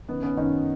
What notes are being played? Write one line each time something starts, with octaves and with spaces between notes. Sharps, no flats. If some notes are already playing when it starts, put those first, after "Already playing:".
F#2 D#3 B3
B3 C#4
F#2 D#3 C#4 D#4